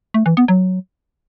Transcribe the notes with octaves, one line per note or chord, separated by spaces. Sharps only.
A3
E3
B3
F#3